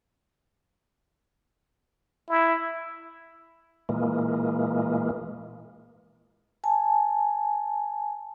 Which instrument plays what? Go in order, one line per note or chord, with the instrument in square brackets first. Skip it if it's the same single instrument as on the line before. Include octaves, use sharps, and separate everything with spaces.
[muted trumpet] E4
[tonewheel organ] A#2 E3 G#3 A#3
[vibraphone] G#5 A5